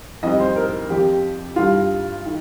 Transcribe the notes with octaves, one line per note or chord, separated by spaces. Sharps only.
F2 D#3 G3 D#5
C5
A#4
F2 F3 G4
G2 G3 F4
D#3